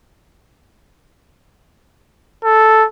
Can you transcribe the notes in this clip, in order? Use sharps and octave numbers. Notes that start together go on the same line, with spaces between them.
A4